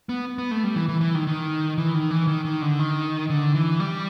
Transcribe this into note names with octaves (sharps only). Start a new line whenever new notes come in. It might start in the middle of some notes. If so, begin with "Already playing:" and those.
B3
B3
A3
G3
E3
E3
E3
D#3
D#3
E3
D#3
E3
D#3
D#3
D3
D#3
D3
E3
G3